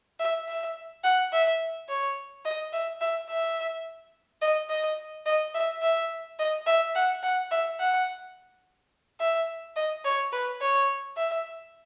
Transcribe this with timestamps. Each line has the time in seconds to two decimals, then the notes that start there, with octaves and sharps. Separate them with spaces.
0.19 E5
0.48 E5
1.04 F#5
1.33 E5
1.88 C#5
2.45 D#5
2.73 E5
3.01 E5
3.29 E5
4.42 D#5
4.70 D#5
5.26 D#5
5.54 E5
5.82 E5
6.39 D#5
6.66 E5
6.95 F#5
7.23 F#5
7.51 E5
7.80 F#5
9.20 E5
9.76 D#5
10.05 C#5
10.32 B4
10.61 C#5
11.17 E5